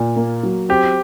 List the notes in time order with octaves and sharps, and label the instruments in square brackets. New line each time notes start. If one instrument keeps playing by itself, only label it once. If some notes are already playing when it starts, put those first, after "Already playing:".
Already playing: [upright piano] A#2
A#3
F#3
[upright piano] C4 [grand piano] G4